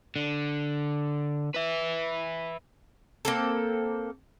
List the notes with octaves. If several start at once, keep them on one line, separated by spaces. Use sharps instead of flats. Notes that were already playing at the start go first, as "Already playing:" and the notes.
D3
B4 E5
A#3 C4 A4